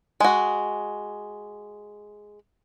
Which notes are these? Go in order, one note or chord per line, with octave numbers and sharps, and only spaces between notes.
G#3 F#4